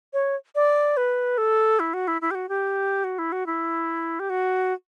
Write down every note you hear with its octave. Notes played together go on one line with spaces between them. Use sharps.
C#5
D5
B4
A4
E4
F#4
E4
E4
G4
F#4
G4
F#4
E4
F#4
E4
G4
F#4